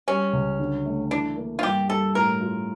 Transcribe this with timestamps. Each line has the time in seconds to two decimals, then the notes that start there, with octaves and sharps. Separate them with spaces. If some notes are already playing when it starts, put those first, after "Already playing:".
0.08 G3 C#4
0.33 C#2
0.60 D3
0.86 A3
1.11 E3 D4
1.37 A#3
1.59 F4
1.63 G2 G4
1.89 G3 A4
2.15 A2 A#4
2.41 F4